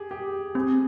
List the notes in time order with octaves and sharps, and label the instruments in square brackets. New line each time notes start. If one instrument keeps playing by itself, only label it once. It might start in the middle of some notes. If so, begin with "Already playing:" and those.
Already playing: [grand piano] G4 G#4
G4
[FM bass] C4 [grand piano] G#4